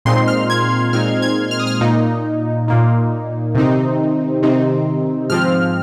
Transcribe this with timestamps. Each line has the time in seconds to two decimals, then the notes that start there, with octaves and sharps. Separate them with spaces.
0.05 A#2 G#3 C4 D#4 C6
0.28 F6
0.50 G#6
0.93 A#2 G#3 C4 D#4 F6
1.22 G#6
1.51 F6
1.59 D#6
1.67 F6
1.81 A#2 A#3 D#4
2.68 A#2 A#3 D#4
3.55 C3 D#3 C4 D#4
4.42 C3 D#3 C4 D#4
5.30 G#2 F3 C4 F6